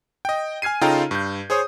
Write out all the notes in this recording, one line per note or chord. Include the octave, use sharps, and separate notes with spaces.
D#5 G5
G#5 F6 G#6 C7 D#7
C#3 D#4 F4 A4 G5 A#5
G2 G6
G#4 C5 C#5 D#6